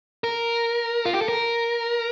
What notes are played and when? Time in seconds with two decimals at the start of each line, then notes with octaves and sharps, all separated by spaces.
0.24 A#4
1.05 F4
1.13 G4
1.21 A4
1.29 A#4